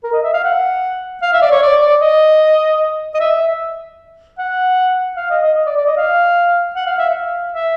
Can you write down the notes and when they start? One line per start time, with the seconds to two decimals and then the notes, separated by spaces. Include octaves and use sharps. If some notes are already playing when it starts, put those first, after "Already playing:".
0.04 A#4
0.13 D#5
0.23 E5
0.34 F5
0.44 F#5
1.22 F5
1.33 E5
1.42 D5
1.51 C#5
1.62 D5
1.82 D5
2.01 D#5
3.15 D#5
3.20 E5
4.38 F#5
5.17 F5
5.30 D#5
5.43 D#5
5.66 D5
5.76 D5
5.86 D#5
5.97 F5
6.76 F#5
6.86 F5
6.98 E5
7.10 F5
7.54 E5